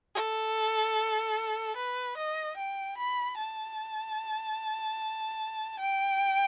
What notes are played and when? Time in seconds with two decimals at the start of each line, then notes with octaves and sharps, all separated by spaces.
0.15 A4
1.76 B4
2.17 D#5
2.57 G5
2.97 B5
3.37 A5
5.79 G5